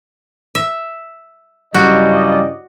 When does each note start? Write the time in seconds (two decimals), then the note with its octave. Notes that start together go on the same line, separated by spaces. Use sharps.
0.55 E5
1.74 G2 C#3 F#3 G3 E4 F#4 D5 D#5